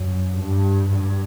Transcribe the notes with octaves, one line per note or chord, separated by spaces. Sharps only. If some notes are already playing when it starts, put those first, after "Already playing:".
Already playing: F#2
G2
G2